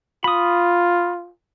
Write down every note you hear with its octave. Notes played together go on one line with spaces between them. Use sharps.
F4 B5 D#6